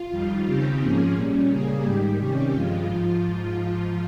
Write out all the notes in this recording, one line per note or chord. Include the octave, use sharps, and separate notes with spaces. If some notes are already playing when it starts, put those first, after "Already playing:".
Already playing: F4
F2 D#3 G3
D#2 C#3 G3 C4 D#4 G4
G#2 F3 A#3 C#4 G#4
A#2 G3 C#4
C#3 G3 A#3 G#4
G#2 D#3 G3 G4
C3 D#3 G3 C#4
G2 F3 G#3 F4
G#2 F3 F4